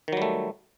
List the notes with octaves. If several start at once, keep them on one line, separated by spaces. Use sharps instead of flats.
D#3 F#3 G3 A3